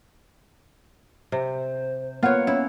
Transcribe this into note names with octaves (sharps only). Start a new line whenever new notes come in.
C3 C5
A#3 B3 F4 C#5 F#5
C#4 E4